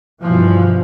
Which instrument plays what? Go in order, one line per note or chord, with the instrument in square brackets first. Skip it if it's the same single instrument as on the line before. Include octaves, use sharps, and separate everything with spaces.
[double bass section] G2 B2 E3 F3